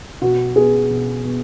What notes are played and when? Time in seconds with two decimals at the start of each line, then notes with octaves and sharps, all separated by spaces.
0.22 B2 F#4
0.56 B3 G#4
0.90 B2
1.25 B3